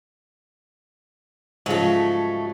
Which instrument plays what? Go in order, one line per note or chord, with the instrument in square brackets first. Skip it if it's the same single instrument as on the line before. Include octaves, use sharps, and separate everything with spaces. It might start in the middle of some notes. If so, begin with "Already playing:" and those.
[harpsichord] G#2 C#3 F3 [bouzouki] F#3 A3